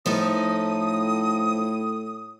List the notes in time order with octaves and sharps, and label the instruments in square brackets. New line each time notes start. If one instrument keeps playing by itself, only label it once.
[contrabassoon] A2 [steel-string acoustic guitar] F3 D#4 A4 [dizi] D#6